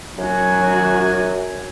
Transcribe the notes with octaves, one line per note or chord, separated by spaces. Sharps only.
F#2 F#3 F#4 G#5